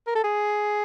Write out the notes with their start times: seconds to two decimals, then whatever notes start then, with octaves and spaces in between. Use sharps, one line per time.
0.07 A#4
0.15 A4
0.24 G#4